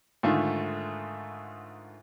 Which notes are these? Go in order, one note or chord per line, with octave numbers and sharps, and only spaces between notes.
G#2 D3 D#3 A3 F4